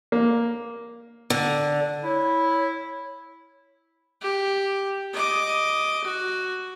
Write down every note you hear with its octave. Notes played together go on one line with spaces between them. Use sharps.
A#3
D3
E4 C#5
G4
D#5 D6
F#4